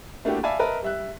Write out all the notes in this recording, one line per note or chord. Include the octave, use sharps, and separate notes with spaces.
A3 A#3 D4 E4 F#4 G4
D5 E5 F5 G#5 A5 B5
A#4 B4 D#5 E5 A5
G3 E5 F#6